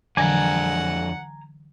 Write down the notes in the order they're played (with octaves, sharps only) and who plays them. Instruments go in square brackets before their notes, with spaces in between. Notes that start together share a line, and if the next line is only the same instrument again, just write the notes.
[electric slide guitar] F2 D4 [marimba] D3 E3 F#3 [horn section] F#5 [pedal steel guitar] G#5 A#5